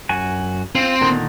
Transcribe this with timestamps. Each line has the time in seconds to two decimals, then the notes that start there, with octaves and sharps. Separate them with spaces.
0.09 F#2 F#4 G#5
0.75 C4 F4
1.01 A#2 D3 D#3